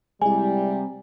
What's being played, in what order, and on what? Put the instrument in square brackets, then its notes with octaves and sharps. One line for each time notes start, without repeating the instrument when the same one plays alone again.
[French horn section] C3 G3 [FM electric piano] G#3 E4 [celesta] G#5